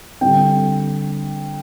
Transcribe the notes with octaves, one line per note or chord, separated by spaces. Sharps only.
D3 G3 C4 G5